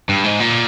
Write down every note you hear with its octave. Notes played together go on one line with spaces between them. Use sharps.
G2
G#2
A#2